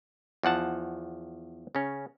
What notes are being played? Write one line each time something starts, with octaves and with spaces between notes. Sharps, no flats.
E2 F3 F#5 A5
C#3 C#4